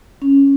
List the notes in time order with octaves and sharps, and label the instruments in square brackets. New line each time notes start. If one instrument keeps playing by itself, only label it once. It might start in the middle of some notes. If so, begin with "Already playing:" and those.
[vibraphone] C#4